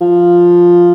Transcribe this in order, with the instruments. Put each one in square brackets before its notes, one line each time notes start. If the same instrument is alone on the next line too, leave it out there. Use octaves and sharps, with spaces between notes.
[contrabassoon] F3